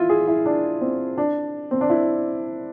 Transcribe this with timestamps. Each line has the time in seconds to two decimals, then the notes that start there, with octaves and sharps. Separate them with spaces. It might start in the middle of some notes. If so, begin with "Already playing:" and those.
Already playing: E4 F4
0.10 G#4
0.28 E4
0.46 D4
0.81 C4
1.18 D4
1.71 C4
1.81 D4
1.90 E4